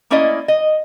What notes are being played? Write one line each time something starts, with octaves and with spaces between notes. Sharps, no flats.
A3 A#3 C#4 E4 D5 D#5
D#5